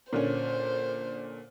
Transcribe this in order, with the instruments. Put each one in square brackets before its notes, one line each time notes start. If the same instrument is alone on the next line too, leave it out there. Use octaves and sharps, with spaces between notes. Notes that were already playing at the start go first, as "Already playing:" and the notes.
[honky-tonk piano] A#2 D3 C#4 [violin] C5